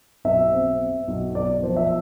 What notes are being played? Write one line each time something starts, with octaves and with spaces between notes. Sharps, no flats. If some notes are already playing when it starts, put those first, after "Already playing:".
B1 E5
C4
C4
B1
B1 D5
F3 C5
E5